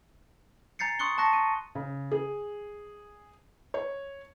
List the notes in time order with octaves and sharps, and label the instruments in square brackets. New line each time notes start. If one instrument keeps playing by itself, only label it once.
[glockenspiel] G#5 A#5 G6 A6 C7 C#7
C6 C#6 D#6 F#6 C#7 G7
A5 C#6 F#6 A#6 C#7
D#7
[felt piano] C#3
G#4
C#5